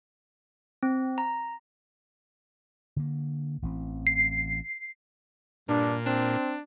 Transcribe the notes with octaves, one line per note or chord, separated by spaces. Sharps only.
C4
A#5
D3 A#3
A1 E3 C4
C7
G2 A#2 D4
C4 D4